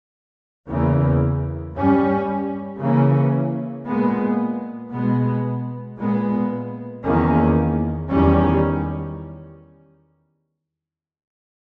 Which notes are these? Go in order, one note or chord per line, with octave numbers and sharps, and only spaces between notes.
E2 C#3 E3 A#3
G2 G3 C#4
C#3 E3 A#3 C#4
A#2 G#3 B3
B2 G#3 B3
A#2 G#3 B3
E2 D#3 A#3 C#4
E2 D#3 G3 C#4